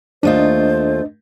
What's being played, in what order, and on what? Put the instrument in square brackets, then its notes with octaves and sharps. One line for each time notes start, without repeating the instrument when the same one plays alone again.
[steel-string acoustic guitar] D#2 A3 F4 [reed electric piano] D4 D#5 [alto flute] C5